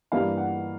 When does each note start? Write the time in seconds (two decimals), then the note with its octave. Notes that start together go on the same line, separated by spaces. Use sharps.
0.12 G2 E3 G3 A#3 F5
0.37 F#5